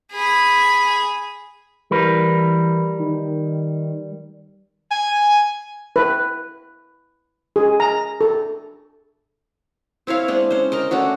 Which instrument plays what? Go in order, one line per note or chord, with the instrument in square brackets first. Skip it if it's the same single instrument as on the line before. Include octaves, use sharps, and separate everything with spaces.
[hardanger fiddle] G#4 B5
[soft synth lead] E3 [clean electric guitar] G3 A#4 B4
[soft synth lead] D#3
[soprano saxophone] G#5
[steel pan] B4
G#4
A#5
A4
[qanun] C4 E4 C#5 F5
G#3 C4 D4
C#4 C5
A#4 D#5 G5
A3 C#4 D4 F#4